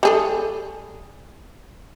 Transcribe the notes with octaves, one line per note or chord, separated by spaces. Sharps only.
G3 G#4 A4